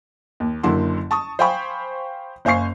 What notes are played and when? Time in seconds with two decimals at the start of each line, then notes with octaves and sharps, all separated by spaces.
0.40 D#2
0.63 F#1 D3 F#3 A#3 E4 C6
1.11 A5 C#6 D#6
1.39 C5 F5 G5 G#5 B5 C#6
2.45 F#1 C5 F5 G#5 C#6 C7